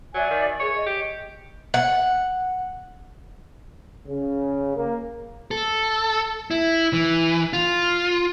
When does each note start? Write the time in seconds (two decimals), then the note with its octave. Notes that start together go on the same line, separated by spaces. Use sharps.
0.14 F#3 D5 E5 G#5
0.30 D#3
0.60 G#4 C#5
0.73 D#5
0.86 G4
1.74 F#5
4.07 C#3
4.77 A#3
5.51 A4
6.51 E4
6.93 E3
7.53 F4